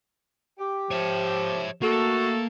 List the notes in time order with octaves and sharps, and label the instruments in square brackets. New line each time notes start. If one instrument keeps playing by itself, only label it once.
[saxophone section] G4
[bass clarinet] F3 [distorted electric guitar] C#5 E5
[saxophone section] A3 A4 [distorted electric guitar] A#3 [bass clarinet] F#4